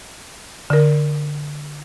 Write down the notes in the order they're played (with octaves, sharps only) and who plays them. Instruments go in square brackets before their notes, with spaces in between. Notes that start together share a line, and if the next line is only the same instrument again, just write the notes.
[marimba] D3 A#4